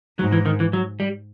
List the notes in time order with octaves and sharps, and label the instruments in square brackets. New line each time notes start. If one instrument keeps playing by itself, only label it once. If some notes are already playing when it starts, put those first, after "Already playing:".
[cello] G#2 [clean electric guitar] F#3
[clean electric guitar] E3
D#3
E3
F#3
G3